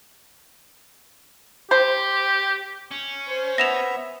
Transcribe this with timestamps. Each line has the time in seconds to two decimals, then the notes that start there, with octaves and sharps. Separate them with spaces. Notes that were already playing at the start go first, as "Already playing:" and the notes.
1.71 G4 C5
2.91 C#4
3.27 C5
3.58 B3 E5 A#6 E7 F7